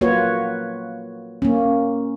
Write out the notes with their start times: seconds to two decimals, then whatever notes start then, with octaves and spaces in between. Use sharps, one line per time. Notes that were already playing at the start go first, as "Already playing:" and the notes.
0.01 A#3 F4 F#4 B4 C#5
1.42 A#3 C#4